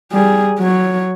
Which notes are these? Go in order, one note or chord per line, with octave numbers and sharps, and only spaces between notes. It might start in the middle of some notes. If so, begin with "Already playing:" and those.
G3 G#4
F#3 C#5